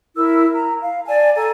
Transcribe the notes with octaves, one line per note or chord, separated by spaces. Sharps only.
E4 A#4 E6
A#5
F5
D5 G#5 A5
A4 G#5 A#5